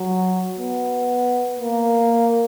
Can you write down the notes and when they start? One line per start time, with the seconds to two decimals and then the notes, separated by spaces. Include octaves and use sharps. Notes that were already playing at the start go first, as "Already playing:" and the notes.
Already playing: F#3
0.59 B3
1.59 A#3